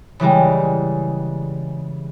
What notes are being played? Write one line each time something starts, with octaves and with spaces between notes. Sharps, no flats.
C#3 E3 G3 G#3